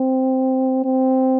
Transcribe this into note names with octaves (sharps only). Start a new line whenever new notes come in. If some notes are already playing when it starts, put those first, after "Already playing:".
Already playing: C4
C4